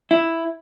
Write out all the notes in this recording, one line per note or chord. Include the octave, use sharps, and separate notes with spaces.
E4